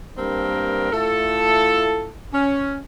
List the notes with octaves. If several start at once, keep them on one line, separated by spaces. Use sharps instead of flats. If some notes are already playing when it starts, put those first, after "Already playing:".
G2 G3 A#3 C4 D4 A#4
A3 E4 F4 A4
C#4